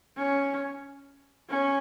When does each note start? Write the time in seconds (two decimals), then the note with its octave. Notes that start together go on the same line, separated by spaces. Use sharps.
0.17 C#4
1.50 C#4